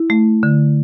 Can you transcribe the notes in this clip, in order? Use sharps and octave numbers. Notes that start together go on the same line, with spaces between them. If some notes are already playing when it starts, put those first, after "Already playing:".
Already playing: E4
A3
D3